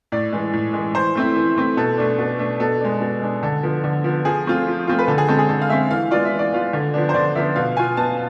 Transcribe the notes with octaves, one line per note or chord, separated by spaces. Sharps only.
A2 D5
E3 G#3
A2
E3 G#3
E3 C5
A3 C4 E4
E3
A3 C4 E4
B2 A4
A3 D4
B2
A3 D4
B2 A4
G#3 D4
B2
G#3 D4
D3 A4
F3 B3
D3
F3 B3
F3 G#4
A3 C4 F4
F3
A3 C4 F4
B4
D3 A4
G#4
G#3 C4 A4
G#4
D3 A4
F5
G#3 C4 E5
E3 F5
G#3 B3 F4 D5
E5
E3
D5
G#3 B3 F4
D3
F3 B3 D4
C5
D3 D5
F3 B3 D4 E5
B2 F5
B3 F4 G#5
B2 A5